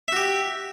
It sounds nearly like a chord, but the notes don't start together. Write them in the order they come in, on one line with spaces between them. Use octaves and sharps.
E5 F#4 G4